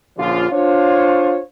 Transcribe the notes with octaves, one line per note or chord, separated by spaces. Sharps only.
A#1 D3 F3 C#4 F4
D4 F4 C5 C#5